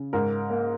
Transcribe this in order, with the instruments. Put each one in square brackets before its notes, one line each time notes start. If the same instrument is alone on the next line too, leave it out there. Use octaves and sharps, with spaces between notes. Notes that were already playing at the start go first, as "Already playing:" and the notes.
Already playing: [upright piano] C#3
G#2 A#4
A#3